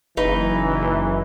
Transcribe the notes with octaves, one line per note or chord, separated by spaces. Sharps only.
F#1 E3 D#4 B4